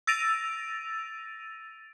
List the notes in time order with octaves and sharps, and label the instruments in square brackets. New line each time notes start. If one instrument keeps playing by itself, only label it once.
[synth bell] E6 A6 A#6 D7 D#7 F7